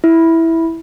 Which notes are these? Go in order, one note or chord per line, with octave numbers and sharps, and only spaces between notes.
E4